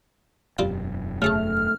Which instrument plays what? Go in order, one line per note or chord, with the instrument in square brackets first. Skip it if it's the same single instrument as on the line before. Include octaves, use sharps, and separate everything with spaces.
[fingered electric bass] E1 F#2 [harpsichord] G3 C4 F4
[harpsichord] C#3 G#4 A4 [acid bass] A3 [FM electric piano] F6